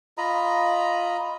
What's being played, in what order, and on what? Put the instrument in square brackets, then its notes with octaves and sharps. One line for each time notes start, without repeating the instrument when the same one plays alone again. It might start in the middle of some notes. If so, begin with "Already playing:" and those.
[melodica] F4 D#5 A#5 B5